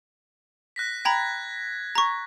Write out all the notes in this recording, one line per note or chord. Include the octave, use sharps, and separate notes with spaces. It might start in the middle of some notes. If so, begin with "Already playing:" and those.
F#6 A#6 B6
G5 A#5 B5 G#6
A#5 C#6